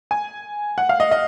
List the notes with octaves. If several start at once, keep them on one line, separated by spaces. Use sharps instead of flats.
G#5
F#5
F5
D#5
D#5